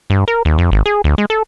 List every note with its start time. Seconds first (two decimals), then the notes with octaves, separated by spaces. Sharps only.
0.10 G2
0.28 A#4
0.45 D#2
0.58 F2
0.72 G#1
0.86 G#4
1.04 D2
1.18 G#3
1.30 A4